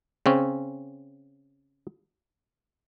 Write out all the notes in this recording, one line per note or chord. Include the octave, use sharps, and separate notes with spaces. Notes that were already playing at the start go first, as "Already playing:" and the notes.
C#3 C4 C#4